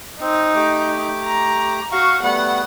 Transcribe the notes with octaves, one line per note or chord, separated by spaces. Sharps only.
C4 D#4
A3 G4 D6
A#5
F#4 F5 C#6
G3 A3 B3 F#5